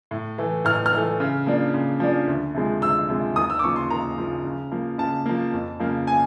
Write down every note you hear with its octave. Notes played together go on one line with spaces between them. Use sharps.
A2
E3 A3
A2 F6
F6
E3 A3
C#3
F3 A#3 D4
C#3
F3 A#3 D4
D2
C3 F3 G#3
D2 E6
C3 F3 G#3
D#2 D#6
E6
D6
C#3 F3 A#3 C#6
C6
D#2 A#5
C#3 F3 A#3
C#3
F3 A#3
C#3 A5
F3 A#3
F2
C#3 F3 A#3
G#5